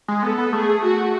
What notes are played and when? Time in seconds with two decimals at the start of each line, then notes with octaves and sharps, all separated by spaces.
0.08 G#3
0.23 B3 A4
0.38 B3
0.53 A3 G#4
0.84 F#4